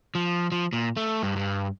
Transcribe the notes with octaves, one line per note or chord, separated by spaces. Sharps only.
F3
F3
A#2
A3
G2
G2